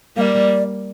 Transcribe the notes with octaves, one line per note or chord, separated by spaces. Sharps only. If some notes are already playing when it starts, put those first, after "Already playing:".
G3 A#3 D5 F5